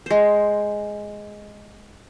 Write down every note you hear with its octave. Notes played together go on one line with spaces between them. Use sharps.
G#3 C5